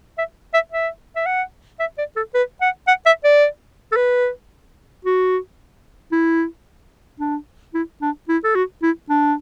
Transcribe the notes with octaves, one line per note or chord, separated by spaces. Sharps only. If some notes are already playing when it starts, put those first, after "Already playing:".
E5
E5
E5
E5
F#5
E5
D5
A4
B4
F#5
F#5
E5
D5
A4
B4
F#4
E4
D4
E4
D4
E4
A4
F#4
E4
D4